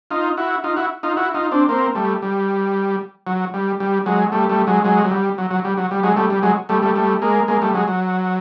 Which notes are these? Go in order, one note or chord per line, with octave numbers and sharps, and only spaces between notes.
D#4 F4
E4 F#4
D#4 F4
E4 F#4
D#4 F4
E4 F#4
D#4 F4
C4 D4
A#3 C4
G3 A3
G3
F#3
G3
G3
F#3 G#3
G3 A3
G3 A3
F#3 G#3
F#3 G#3
F#3
G3
F#3
F#3
G3
F#3
G3
F#3 G#3
G3 A3
G3
F#3 G#3
G3 A3
G3 A3
G3 A3
G#3 A#3
G#3 A#3
G3 A3
F#3 G#3
F#3